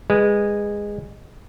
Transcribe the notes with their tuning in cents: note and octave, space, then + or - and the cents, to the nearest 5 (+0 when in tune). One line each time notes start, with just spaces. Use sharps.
G#3 -15 B4 +0